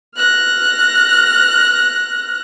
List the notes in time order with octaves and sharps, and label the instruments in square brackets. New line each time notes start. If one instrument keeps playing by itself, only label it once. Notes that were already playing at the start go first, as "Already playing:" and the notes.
[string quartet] F6 F#6 A#6